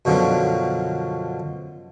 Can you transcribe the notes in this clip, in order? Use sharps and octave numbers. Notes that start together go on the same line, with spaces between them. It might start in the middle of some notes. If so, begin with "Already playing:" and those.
F#2 B2 D3 F3 F#3 D4